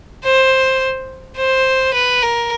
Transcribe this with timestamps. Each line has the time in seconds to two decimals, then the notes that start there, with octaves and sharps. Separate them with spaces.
0.24 C5
1.37 C5
1.93 B4
2.22 A#4